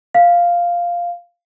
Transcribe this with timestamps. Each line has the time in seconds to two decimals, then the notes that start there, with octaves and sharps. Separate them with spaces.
0.15 F5